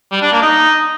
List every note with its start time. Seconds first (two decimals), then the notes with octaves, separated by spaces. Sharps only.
0.12 G3
0.22 D4
0.32 A#3
0.42 D#4